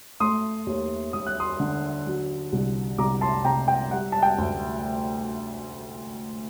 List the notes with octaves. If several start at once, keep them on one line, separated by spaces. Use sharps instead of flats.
A3 C6 D#6
D#2
D#2 D#6
F#6
C6 D#6
D3
F#3
C2
C2 A#5 D6
A5 C6
C3 G5 A#5
G5
G3 F#5
A5
G5
D2